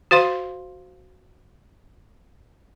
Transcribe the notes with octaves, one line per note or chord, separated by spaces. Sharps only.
F#4 C5 F5 C6